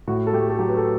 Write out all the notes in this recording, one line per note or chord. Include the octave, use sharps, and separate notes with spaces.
A2 F#4
A4
A3 G4
A4
F#3 G4
B4
A4